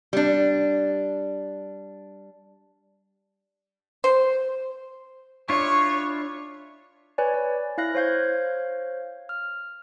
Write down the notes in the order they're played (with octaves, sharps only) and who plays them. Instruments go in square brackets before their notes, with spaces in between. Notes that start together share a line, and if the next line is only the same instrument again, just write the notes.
[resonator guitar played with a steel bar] G3 D4
[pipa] C5
[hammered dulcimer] D4 [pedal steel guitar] E4 F4 [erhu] C#5 [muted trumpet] C#6
[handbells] B4 C#5 D5 G#5
D5
E4 F5 F#6 A#6
C5 C#5 F5 G6 G#6
F6